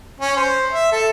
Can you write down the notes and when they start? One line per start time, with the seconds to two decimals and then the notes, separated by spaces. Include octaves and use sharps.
0.21 C#4
0.37 C5
0.72 E5
0.92 A4